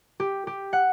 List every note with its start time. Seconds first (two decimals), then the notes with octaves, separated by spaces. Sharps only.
0.20 G4
0.47 G4
0.73 F#5